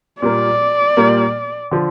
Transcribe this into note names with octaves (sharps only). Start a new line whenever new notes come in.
A#2 G3 A#3 D5
A#2 G3 A#3
D3 F3